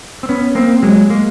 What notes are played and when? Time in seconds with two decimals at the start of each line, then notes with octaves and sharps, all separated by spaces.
0.23 C4
0.29 B3 C#4
0.55 A#3 C4
0.82 F#3 G#3
1.10 G#3 A#3